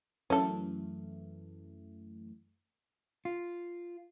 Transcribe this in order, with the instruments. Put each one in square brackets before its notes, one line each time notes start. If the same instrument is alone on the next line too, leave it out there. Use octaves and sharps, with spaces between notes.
[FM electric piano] F#2 E3 A3 [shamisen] C#4 A4
[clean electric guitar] F4